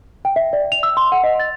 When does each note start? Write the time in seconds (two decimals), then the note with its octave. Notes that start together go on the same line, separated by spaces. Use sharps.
0.25 G5
0.36 E5
0.53 D5
0.72 F7
0.83 E6
0.97 C6
1.12 F#5
1.24 D#5
1.40 A6